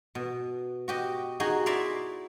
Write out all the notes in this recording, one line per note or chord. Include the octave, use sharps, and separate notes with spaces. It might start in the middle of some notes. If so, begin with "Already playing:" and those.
B2
F#4 G4 D#5
D#4 F#4 G#4
E4 D5 E5 A#5 C6